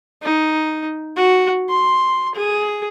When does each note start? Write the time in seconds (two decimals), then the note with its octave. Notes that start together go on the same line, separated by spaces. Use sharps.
0.22 D#4
1.17 F#4
1.69 C6
2.35 G#4